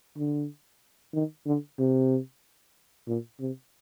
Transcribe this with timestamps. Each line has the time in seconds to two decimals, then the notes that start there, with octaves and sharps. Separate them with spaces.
0.17 D3
1.13 D#3
1.46 D3
1.79 C3
3.07 A#2
3.40 C3